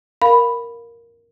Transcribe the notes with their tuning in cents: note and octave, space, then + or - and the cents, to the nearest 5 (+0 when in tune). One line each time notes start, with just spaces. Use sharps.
A#4 +0 F5 +15 B5 +0